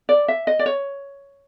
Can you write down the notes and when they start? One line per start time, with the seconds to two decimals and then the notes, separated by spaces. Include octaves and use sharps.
0.09 D5
0.28 E5
0.47 D#5
0.59 D5
0.66 C#5